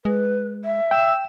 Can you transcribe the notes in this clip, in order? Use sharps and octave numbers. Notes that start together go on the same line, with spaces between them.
G#3 B4
E5
G5 E6